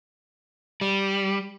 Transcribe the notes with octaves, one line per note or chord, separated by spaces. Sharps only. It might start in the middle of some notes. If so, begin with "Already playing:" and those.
G3